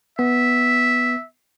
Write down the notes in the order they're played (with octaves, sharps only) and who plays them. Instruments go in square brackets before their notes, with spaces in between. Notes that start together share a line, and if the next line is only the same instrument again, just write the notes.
[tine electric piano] B3 [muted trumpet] E5